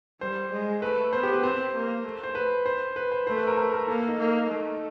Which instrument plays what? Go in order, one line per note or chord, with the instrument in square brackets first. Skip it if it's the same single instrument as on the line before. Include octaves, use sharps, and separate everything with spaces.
[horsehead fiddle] G3 [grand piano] C5
[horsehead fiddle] G#3
[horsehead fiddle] A3 [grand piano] B4
[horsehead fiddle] B3 [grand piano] C5
[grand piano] G4
B4
[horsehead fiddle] C4 [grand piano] C5
[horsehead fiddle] A#3
A3
[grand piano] C5
B4
C5
B4
C5
[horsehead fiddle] A3 [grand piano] C5
[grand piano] B4
A#4
A#4
A#4
[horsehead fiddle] A#3 [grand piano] A4
[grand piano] D#4
[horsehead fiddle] A#3
A3